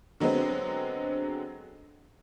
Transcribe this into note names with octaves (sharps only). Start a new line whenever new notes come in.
D3 F#3 G#3 B3 C4